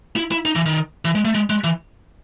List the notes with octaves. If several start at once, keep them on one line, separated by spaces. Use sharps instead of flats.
E4
E4
D#4
E3
D#3
E3
G#3
A3
G#3
G#3
E3